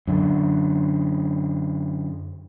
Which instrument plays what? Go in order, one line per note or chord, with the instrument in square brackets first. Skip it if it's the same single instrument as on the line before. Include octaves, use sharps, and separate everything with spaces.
[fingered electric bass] F#2 D3